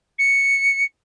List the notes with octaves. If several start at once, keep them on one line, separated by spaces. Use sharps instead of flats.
C#7